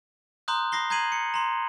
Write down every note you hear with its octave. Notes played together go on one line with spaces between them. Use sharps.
A#5 C6 D#6 F#6 G6
B5 D#6 A#6 C7 G7
A#5 G6 G#6 C7 D#7 F#7
C#7
A#5 C6